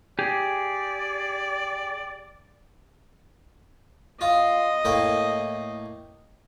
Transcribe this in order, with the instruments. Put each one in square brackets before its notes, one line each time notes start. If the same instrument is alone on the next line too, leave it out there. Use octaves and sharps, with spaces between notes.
[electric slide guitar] G4 G#4 [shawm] D5
[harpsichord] F4 [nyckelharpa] D#5
[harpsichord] A2 A#3 G5